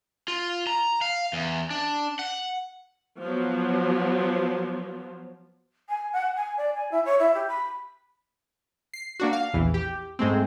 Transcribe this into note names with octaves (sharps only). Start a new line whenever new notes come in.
F4
A#5
F5
E2
D4
F#5
F3 F#3 B3
G#5
F#5
G#5
D5
G#5
E4
C#5
E4
G4
B5
C7
A#3 D4 F#4
F5
A#1 E2 E3
G4
G#2 G#3 A3 C4